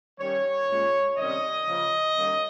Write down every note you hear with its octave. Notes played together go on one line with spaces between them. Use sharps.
D#3 G3 C#4 C#5
A#2 G#3 C#4
C3 D#3 G3 C#4 D#5
C#3 F3 A#3 C#4
D#3 G3 A#3 C#4